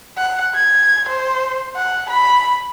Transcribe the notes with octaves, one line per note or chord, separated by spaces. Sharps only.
F#5
G#6
C5
F#5
B5